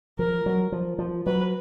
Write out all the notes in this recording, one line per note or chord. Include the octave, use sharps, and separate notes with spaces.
F3 A#4
F#3
F3
F3
F#3 B4